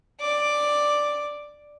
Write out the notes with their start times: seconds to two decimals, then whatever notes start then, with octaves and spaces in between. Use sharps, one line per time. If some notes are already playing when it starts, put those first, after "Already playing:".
0.21 D5 D6